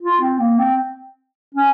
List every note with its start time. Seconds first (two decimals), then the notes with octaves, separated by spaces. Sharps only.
0.03 F4
0.21 C4
0.40 A#3
0.59 C4
1.55 C#4